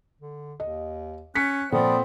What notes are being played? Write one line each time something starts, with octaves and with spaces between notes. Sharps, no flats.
D3
D#2 D#5
C#4 F#6 B6 C#7
A#2 F3 C4 A4 D5 F#5 B5 D#6